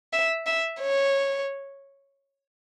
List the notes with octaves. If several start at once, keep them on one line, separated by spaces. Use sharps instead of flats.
E5
E5
C#5